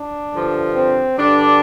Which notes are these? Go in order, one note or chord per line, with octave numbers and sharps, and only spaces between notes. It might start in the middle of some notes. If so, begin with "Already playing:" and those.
Already playing: D4
G2 D3 F3
C4
G2 D3 G3 D4